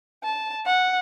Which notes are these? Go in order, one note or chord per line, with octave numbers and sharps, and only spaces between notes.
A5
F#5